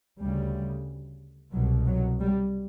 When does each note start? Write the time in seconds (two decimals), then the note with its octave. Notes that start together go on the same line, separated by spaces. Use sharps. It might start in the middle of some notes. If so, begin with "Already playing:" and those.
0.19 D2 C#3 G3
1.53 C2 B2 F#3
1.87 F#3
2.19 G3